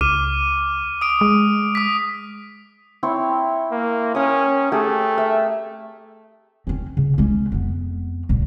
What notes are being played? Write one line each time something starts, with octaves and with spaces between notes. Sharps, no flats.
C#2 D6 F6 D#7
D#6 D7
G#3
D#6 B6
C4 E4 C#5
A#3
C#4 A#4 D#6
A3 G4 G#4 A#4
E5
C4 C#4
C#3
G#3 C#4
F2 B3
D2 A#2